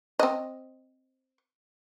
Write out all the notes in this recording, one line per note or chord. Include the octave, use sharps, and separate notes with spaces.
C4 D#5